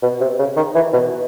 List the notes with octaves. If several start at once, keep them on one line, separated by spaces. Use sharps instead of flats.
B2
C3
C#3
D#3
E3
B2